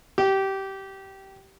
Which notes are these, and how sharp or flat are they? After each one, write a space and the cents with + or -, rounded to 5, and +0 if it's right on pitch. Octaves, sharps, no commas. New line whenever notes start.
G4 -20